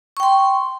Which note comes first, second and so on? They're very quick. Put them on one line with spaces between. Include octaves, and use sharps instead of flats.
C#6 G5 C6